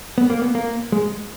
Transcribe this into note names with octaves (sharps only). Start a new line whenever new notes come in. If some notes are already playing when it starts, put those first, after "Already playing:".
B3
A#3
B3
A#3
G#3